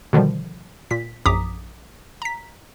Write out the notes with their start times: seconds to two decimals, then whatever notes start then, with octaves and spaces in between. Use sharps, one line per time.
0.13 B2 D3 D#3 F3 G3
0.91 A#2 B6
1.26 A#1 F#2 A#5 D6 D#6 B6
2.22 A#5 B6